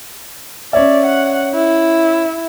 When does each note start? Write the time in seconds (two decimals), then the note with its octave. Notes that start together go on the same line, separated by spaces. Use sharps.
0.73 C#4 C#5 D5 E5
1.05 F#5
1.54 E4